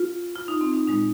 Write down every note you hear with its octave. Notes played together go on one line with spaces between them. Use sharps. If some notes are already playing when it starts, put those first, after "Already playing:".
Already playing: F4
F4
D#4
C4
D#4
A#2 G#3 D#4